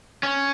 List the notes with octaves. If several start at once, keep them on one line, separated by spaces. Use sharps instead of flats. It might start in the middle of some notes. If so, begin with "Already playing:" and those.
C#4